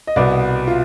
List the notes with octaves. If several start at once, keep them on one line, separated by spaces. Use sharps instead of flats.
D#5
C2 B2 B3 D5
F4